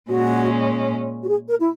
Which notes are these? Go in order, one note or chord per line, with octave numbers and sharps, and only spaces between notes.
A#2 G#3 C#4 F#4
F#4
G#4
A#4
E4